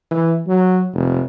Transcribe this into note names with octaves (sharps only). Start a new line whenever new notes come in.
E3
F#3
F1